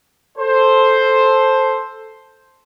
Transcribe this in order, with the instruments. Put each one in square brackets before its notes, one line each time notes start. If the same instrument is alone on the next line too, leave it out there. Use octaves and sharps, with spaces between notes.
[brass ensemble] A4 C5